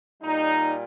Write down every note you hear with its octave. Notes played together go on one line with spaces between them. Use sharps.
A#2 G3 D#4